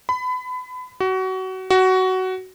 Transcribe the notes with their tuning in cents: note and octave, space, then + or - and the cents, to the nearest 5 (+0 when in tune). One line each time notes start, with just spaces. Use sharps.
B5 +30
F#4 +25
F#4 +15